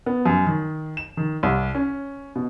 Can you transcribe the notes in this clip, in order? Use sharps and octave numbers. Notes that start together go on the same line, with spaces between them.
B3
F#2
D#3
E7
D#3
C2
C#4
B2